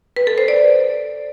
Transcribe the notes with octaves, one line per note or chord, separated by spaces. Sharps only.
B4
A4
C5
D5